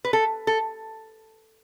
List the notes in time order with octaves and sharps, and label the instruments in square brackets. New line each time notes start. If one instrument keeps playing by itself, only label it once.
[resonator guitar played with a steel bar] B4
A4
A4